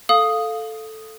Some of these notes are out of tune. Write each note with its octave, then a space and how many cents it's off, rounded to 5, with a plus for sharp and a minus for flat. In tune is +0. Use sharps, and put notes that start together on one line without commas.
A4 +0 F5 +0 D#6 +0